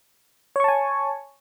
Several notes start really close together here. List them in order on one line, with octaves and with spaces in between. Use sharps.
C#5 C#6 A5 G#5